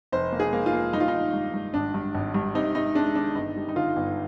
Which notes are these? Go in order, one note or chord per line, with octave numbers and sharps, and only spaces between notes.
F1 C5
A#3
G#4
A#3
F4
A#3
G2 D#4
F4
D#4
D#3
G2
G2
G#1 D4
G2
G#1
G2
C3 D#4
C3 D#4
G#3 D4
D#3 D4
G1 D#4
G3
D#4
D3 F4
G1